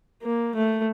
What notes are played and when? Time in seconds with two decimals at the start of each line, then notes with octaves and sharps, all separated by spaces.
0.23 A#3
0.56 A3